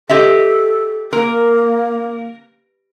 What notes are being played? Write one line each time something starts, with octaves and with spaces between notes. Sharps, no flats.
G4 A4 D#5 E5
A#3 A#4